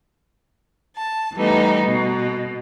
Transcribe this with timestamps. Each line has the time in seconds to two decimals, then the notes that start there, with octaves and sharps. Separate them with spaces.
0.96 A5
1.35 E3 G3 A3 B3 D#4
1.86 B2